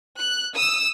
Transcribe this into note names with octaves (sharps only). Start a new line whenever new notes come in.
F#6
D#6 E6